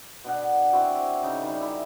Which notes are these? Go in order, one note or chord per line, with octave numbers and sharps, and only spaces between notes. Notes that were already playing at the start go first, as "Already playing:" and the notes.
B2 D4 F#5
C4 E4 F#4 G5
C#3 D#4
D#3 G3
E4 E5 G#5